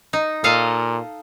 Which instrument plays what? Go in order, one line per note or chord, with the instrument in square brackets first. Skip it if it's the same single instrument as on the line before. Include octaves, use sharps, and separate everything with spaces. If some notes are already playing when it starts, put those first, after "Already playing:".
[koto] D#4
[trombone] A#2 [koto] A4 D#5 F5